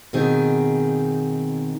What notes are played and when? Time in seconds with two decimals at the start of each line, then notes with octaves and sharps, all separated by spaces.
0.13 B2 D#3 C4 G#4